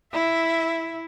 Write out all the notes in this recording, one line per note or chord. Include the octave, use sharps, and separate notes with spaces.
E4 E5